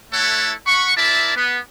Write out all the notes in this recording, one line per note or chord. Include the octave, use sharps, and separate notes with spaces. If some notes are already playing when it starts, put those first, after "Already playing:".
A3 E4 A4 C#5 F#5
F#5 B5 C#6
E4 A#4 D5 E5 A5
B3